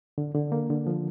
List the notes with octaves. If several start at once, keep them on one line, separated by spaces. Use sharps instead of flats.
D3
D3
A#3
D3
F3